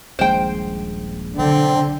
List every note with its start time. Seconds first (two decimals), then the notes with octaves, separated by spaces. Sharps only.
0.19 D#1 A#1 G#3 C5 G5
1.38 B1 D3 C4